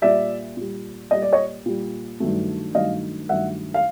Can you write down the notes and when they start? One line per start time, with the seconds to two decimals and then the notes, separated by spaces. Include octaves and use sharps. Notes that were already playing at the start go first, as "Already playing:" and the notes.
0.02 A#2 G3 D5 E5
0.57 A#2 G3
1.11 A#2 G3 D#5
1.22 D5
1.33 C#5 D#5
1.66 A#2 G3
2.20 G2 D#3 F#3 A3
2.75 G2 D#3 F#3 A3 D#5 F5
3.29 G2 D#3 F#3 A3 E5 F#5
3.74 F5